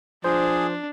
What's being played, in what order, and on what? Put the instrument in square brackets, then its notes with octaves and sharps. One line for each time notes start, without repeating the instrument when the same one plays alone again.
[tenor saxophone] F3 [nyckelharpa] D4 [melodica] G#4 [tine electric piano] C5